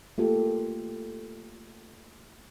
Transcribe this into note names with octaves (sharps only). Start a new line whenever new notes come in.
A3 A#3 F4 G4 A4